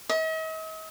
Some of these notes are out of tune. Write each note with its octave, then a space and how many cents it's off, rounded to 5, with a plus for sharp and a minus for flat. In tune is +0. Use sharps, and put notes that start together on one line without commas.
D#5 +45